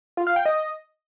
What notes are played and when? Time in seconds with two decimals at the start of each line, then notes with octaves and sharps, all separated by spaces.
0.17 F4
0.27 F5
0.36 G5
0.46 D#5